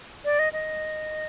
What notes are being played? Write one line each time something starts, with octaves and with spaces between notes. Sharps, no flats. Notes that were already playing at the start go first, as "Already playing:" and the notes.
D5
D#5
D#5